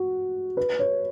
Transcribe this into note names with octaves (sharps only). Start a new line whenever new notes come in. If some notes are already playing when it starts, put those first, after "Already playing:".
Already playing: F#4
B4
C#5